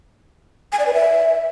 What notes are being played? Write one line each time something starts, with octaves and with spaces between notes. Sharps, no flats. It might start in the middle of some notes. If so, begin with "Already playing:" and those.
G#5
D5
B4
E5